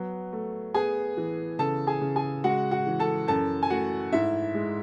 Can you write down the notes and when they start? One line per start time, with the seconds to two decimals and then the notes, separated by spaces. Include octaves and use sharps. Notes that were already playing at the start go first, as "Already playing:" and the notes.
Already playing: F#3 B3
0.33 A3
0.74 B3 G#4 G#5
1.17 E3
1.59 C#3 A4 A5
1.87 G#4 G#5
2.01 C#3
2.16 G#4 G#5
2.44 G#3 F#4 F#5
2.71 F#4 F#5
2.87 E3
3.00 A4 A5
3.28 F#2 A4 A5
3.63 G#5
3.70 A3 F#4 F#5
4.12 G#2 E4 E5
4.54 G#3